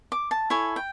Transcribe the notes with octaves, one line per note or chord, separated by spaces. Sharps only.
D6
A5
E4 A4 C#5 G#5
G5